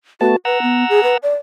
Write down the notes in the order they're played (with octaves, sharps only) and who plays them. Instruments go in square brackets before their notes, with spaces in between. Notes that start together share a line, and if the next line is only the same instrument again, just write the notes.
[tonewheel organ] A3 B3 A5 [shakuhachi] F#4
[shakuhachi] B4 [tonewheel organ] F#5 A#5 E6
[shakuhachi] B3
G#4
B4
D5